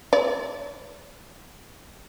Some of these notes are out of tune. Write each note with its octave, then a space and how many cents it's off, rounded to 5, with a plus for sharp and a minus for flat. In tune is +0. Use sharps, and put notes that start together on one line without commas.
C#5 +45